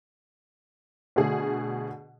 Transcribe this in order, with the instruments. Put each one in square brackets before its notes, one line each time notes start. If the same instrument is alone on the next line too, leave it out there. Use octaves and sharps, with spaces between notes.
[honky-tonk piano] B2 D3 A3 G#4